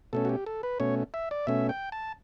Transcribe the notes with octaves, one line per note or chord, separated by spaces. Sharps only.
B2 A3 C#4 A4
F#4
G4
A4
B4
B2 A3 C#4 C#5
E5
D5
B2 A3 C#4 E5
G5
A5